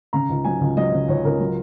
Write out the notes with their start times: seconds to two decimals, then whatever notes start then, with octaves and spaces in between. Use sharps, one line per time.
0.13 C#3 A#5
0.29 C#2
0.45 F#3 G#5
0.61 C#2
0.77 F#3 D#5
0.93 C#3
1.08 C#2 C#5
1.25 C#2 A#4
1.39 F#3